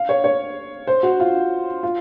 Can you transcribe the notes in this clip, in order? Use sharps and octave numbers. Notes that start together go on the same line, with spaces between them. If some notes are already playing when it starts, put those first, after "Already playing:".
Already playing: F5
C#5
C#5
C5
F#4
F4
F4